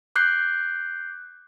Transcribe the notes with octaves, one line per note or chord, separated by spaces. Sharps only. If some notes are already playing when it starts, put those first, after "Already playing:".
D6 F#6 G6 C7